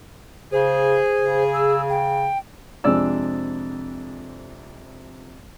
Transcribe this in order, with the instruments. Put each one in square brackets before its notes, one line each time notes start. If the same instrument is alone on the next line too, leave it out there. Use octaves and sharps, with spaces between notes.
[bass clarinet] C#3 [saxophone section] G#4 [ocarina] C5
[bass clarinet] C#3
[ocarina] E6
G5
[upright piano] F2 C3 G#3 D4 D5 E6